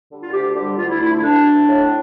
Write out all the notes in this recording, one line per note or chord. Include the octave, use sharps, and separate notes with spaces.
D3 G3
F4
D2 G4
D3 G3 G4
D2 F4
E4
D3 A3 E4
E4
D2 D4
D3 A3
A2